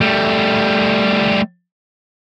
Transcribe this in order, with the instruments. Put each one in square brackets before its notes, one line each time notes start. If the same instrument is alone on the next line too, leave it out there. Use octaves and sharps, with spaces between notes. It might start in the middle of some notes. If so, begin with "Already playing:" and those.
[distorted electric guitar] G3 A3